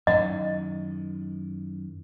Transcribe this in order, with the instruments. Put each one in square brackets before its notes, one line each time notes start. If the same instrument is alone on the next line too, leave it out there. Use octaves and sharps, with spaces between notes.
[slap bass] F#2 A2 D#3 [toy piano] D#5